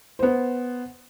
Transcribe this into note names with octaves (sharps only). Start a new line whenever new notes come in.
B3 C5